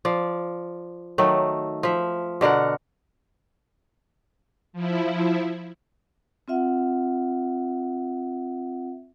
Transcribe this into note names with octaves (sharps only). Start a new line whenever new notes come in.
F3 D5
D#3 F#3 A3
F3 E5
B2 D3 A#4 F#5
F3 E4
C4 F4 E5 F#5